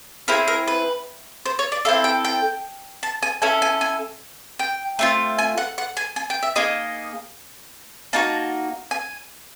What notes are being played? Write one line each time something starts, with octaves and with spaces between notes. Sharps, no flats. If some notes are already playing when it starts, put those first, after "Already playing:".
C4 E4 G#4 A#4
A#4
B4
C5
C#5
D5
C4 E4 A4 F5
G5
G5
A5
G#5
C#4 E4 A4 G#5
G#5
G#5
G5
A3 C4 F4
G#5
F#5
F#5
G#5
G#5
G5
E5
A#3 D#4 G#4 D#5
A#3 D#4 F#4 A5
G#5